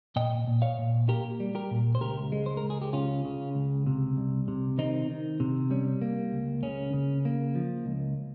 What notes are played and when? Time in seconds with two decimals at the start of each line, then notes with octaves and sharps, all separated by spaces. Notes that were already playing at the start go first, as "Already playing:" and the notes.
0.16 A#2 D#5 G5
0.47 A#2
0.62 C#5 F5
0.78 A#2
1.08 A#3 G4 A#4
1.40 G3
1.55 G4 A#4
1.71 A#2
1.95 C5
2.01 C#2 G4 A#4
2.32 G#3
2.46 C5
2.57 A#4
2.63 C#2
2.70 G#4
2.82 G4
2.93 C#3 C#4 F4
3.25 C#3
3.55 C#2
3.87 C3
4.17 C2
4.48 C3
4.78 D#3 C4 D#4
5.10 D#3
5.40 C3
5.70 G3 C#4
6.02 A#3
6.32 C#2
6.63 C#3 C#4
6.93 C#3
7.25 A#3
7.55 F3
7.86 C#2